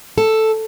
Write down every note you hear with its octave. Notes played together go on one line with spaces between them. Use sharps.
A4